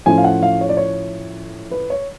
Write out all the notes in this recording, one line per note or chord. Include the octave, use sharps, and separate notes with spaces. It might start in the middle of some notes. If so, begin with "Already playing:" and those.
A2 F3 A3 C#4 G#5
F5
F#5
F5
C#5
D5
C#5
B4
C#5